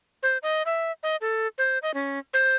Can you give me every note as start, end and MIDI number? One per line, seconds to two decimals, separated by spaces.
0.23 0.38 72
0.43 0.63 75
0.66 0.92 76
1.03 1.16 75
1.21 1.47 69
1.58 1.78 72
1.82 1.94 75
1.94 2.19 61
2.33 2.56 72